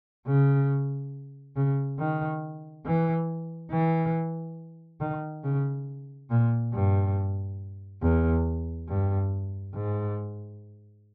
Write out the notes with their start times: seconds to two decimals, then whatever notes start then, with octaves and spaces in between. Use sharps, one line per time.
0.27 C#3
1.56 C#3
1.99 D#3
2.86 E3
3.71 E3
5.00 D#3
5.44 C#3
6.30 A#2
6.73 G2
8.02 E2
8.88 G2
9.74 G#2